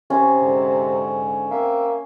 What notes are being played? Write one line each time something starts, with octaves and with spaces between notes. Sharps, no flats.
C3 C#4
G#2 D3
A#3 C4 E5